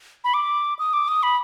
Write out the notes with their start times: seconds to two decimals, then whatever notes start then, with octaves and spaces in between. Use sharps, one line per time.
0.24 B5
0.34 D6
0.79 D#6
0.93 D6
1.08 D#6
1.23 B5